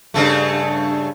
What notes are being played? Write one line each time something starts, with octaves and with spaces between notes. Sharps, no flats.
G2 C#3 A3